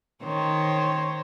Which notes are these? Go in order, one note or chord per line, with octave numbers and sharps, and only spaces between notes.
D#3 C5 C#5